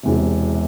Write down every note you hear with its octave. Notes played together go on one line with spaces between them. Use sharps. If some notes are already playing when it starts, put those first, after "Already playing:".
E1 E2 C3